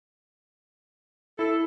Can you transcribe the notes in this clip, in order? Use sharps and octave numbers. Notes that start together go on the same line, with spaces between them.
E4 A4